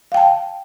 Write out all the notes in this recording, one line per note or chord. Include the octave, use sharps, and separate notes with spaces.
F5 G5 A5